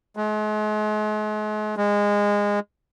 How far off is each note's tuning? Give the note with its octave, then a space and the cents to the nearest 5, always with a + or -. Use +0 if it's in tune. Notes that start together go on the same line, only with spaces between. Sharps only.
G#3 +40
G#3 -20